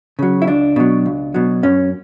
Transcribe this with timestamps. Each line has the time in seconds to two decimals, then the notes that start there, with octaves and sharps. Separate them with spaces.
0.19 C#3 F#3
0.42 E4
0.47 C#2 D4
0.76 B2 F#3
1.06 C#2
1.34 B2 F#3
1.63 F#2 C#4